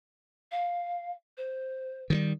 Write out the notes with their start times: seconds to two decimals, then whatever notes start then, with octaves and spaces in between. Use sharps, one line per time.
0.51 F5
1.37 C5
2.10 D#3 F3 G3